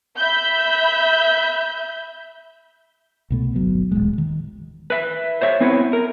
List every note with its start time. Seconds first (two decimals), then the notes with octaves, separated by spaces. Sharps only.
0.17 E5 B5 G6
3.30 C2 B2 A3
3.55 G1 F#3 B3
3.92 D#1 A1 A2 G#3
4.18 D#3
4.90 B4 E5
5.42 C5 C#5 E5
5.60 B3 C4 E4 B4 C#5 F#5
5.93 A#4